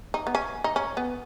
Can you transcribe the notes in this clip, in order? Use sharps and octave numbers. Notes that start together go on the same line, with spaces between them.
D#4
B3
C#4
D#4
C#4
B3